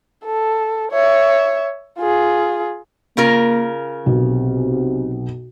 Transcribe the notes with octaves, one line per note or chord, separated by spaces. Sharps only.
A4
C#5 E5
F4 G#4
C#3 A#3 F4 A#4
B1 C3